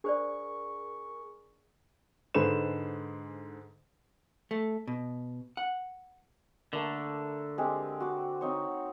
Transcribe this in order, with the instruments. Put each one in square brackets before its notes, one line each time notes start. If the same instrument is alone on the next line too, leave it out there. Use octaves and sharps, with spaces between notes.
[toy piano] D4 C5 D5 [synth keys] G#4 A#4 C#6
[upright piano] G#2 D3 G#3 B4 C5 E7
[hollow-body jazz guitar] A3
B2
F#5
[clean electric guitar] D3 [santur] A3 A#3
[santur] G#3 C4 G4
F#4 D6
C4 D#4 C#5